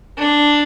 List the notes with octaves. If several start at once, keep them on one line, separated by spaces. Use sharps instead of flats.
D4